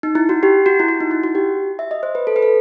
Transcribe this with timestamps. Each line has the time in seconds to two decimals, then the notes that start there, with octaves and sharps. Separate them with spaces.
0.03 D#4
0.15 E4
0.29 F#4
0.43 G4
0.66 F#4
0.80 E4
0.88 F#4
1.00 D#4
1.11 E4
1.23 F#4
1.35 G4
1.79 E5
1.91 D#5
2.03 C5
2.15 B4
2.27 A4
2.36 B4
2.42 A4